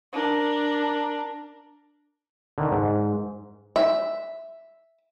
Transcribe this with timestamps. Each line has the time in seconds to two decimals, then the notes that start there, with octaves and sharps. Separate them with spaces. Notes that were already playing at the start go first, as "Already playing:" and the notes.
0.13 D4 A#4
2.58 D3 D#3
2.72 G#2
3.76 E5